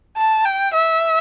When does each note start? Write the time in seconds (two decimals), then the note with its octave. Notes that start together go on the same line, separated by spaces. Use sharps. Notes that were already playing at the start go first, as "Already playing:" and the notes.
0.17 A5
0.46 G5
0.74 E5